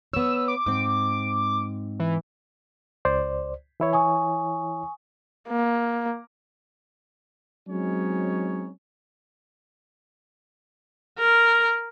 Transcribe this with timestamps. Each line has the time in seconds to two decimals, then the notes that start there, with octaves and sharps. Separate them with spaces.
0.13 B3 C#5 E6
0.48 D6
0.66 G#2 C4 D6
2.00 E3
3.05 C#2 C5 D5
3.80 E3 E4 C#5
3.93 G#5 C#6 D#6
5.49 A#3
7.68 F#3 G#3 C4 C#4 D#4 C#5
11.18 A#4